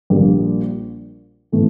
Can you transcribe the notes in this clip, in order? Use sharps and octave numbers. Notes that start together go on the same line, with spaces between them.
A#1 A#2 G3 A#3
A2 E3 A3